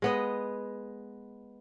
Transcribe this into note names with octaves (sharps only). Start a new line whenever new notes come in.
G#3 B3 D#5